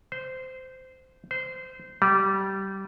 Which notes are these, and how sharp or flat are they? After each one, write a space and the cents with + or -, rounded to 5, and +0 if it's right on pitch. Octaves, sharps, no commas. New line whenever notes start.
C5 -15
C5 -20
G3 -20